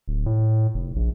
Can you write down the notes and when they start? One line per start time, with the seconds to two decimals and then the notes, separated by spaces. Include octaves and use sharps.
0.08 D1
0.26 A2
0.74 F1
0.96 A#1